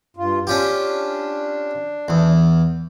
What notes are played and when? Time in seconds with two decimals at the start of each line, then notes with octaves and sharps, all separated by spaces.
0.17 G2 F4
0.47 C#4 D4 F4 G4
2.08 E2